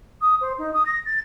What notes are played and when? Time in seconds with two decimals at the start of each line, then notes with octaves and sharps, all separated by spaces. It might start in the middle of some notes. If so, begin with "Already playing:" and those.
0.21 D#6
0.41 C5
0.58 D#4
0.73 D#6
0.85 A#6
1.05 A6